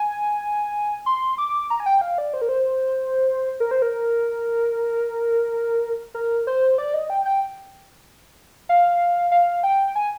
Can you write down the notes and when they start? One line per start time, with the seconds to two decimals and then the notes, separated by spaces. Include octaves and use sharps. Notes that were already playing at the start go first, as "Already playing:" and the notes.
Already playing: G#5
1.06 C6
1.38 D6
1.70 A#5
1.80 G#5
1.86 G5
2.01 F5
2.18 D5
2.34 C5
2.42 A#4
2.49 C5
3.60 A#4
3.71 C5
3.82 A#4
6.15 A#4
6.47 C5
6.78 D5
6.94 D#5
7.10 G5
7.25 G5
8.69 F5
9.32 F5
9.63 G5
9.96 G#5